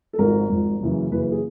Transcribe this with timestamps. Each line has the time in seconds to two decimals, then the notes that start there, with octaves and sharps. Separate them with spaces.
0.13 A4
0.18 G#1 G#2 F3 A#4
0.49 G#1 G#2 F3
0.80 F#1 F#2 C#3 E3
1.11 F#1 F#2 C#3 E3 B4
1.22 B4
1.32 G#4